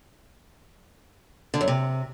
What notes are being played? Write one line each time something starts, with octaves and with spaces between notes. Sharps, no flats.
D3
F#2
C3